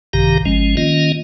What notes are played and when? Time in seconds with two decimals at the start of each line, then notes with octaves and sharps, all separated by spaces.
0.13 A#1 G2 C3 D#3 G4 A#5
0.45 G#1 F3 G#3 C#4
0.77 D#3 A#3 C#4 F4 D#5